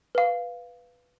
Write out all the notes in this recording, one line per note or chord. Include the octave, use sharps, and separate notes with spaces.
B4 F5